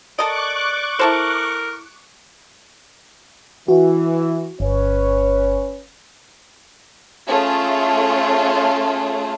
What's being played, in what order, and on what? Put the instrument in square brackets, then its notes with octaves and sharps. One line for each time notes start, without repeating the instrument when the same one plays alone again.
[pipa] A4 A#4 D#5 [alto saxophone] D5 [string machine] C#6 D6 F#6
[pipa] E4 A4 C5 [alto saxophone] A#4
[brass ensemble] E3 [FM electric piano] F#4
[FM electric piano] G1 [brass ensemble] C#4 B4 C#5
[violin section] A3 C#4 F4 G#4 A4